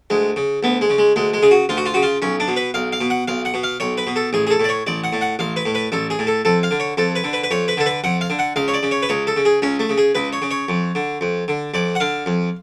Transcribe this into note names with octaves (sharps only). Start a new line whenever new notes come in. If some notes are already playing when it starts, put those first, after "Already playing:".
D2 G#3
C#3
D2 B3
G#3
C#3
G#3
D2 G#3
G#3
C#3 G#4
F#4
D2 F4
F#4
F4
C#3 F#4
F4
B1 C#4
D4
B2
B4
B1 F5
F5
B2
F#5
B1 F5
F#5
B2
F5
B1 C#5
B4
B2
A4
A1 G#4
G#4
A4
A2 D5
C#5
A1 D5
F#5
A2
F#5
A1 F5
B4
A2
B4
A1 A4
G#4
A2
A4
F2 A4
F5
D3
C#5
F2 A4
B4
D3
B4
B4
F2 C#5
B4
D3 A4
B4
F2 F#5
F5
D3
F#5
C#2 F5
C#5
D5
C#3
C#5
B4
C#2 C#5
A4
C#3
G#4
C#2 C#4
A3
C#3
G#4
C#2 B4
C#5
C#3
C#5
F2
D3
F2
D3
F2 D5
F#5
D3 F5
F2